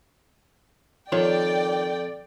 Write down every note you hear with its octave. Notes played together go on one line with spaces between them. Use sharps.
F2 D#3 F4 C#5 D5 G5